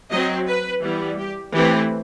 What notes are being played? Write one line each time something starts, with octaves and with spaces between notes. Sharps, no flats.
F#3 C4 D#5
B4
E3 G3 B3
G4
E3 A3 C4 G4